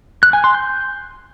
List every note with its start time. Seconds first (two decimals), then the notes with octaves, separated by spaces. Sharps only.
0.23 F#6
0.33 G#5
0.44 C6
0.54 G6